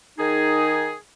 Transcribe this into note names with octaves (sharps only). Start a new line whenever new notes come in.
D#3 D#4 G#4